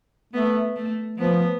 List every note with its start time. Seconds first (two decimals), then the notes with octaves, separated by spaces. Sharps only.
0.33 A3 B3
0.76 A3
1.18 F3 B3